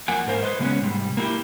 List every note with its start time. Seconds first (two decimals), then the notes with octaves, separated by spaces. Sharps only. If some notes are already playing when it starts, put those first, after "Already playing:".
0.08 F2 A#3 F#5 G#5
0.27 G#2 A#4 C5 F5
0.43 B4 C5 D#5
0.59 C#3 G#3 A#3 B3 C#4
0.81 G#2 C3 G3
1.17 A#3 E4 F#4 G4